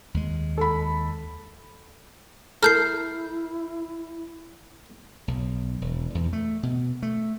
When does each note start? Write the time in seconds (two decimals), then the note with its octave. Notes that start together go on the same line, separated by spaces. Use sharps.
0.14 D#2 G#3
0.58 A4 B5
2.63 E4 A4 A#4 F6 G6 C7
5.28 B1
5.81 E1
6.15 E2
6.33 A3
6.63 B2
7.03 A3